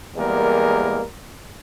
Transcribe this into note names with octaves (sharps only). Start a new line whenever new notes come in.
E2 G3 G#3 A#3 A#4